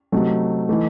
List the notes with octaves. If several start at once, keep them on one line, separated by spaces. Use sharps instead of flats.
C3 F#3 A3 D#4
E3 A3 D#4